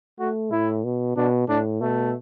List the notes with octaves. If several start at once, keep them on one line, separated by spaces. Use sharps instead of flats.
A3 F#4
A2 E4
B2
B2 D4
A2 D4
B2 A3